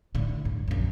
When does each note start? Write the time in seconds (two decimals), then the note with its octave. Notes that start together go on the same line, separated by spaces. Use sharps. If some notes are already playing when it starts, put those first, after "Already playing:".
0.15 A2 D3
0.45 G2
0.68 A#1 F#2